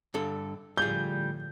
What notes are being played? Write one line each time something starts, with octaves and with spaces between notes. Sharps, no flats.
G2 D3 A4
A2 D3 F3 G3 F4 G#4 G6